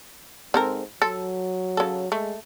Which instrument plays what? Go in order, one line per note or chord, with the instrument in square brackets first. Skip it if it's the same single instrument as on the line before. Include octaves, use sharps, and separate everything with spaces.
[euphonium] G#2 [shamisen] C4 A4 A#4
[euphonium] F#3 [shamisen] A4
[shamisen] C#3 A4
[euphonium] G#3 [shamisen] A3